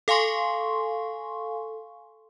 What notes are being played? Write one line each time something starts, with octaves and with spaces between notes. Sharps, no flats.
A4 F5 G#5 C6 C#6